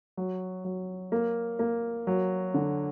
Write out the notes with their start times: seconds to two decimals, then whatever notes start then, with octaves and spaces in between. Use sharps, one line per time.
0.17 F#3
0.65 F#3
1.12 A#3
1.59 A#3
2.07 F#3
2.54 D3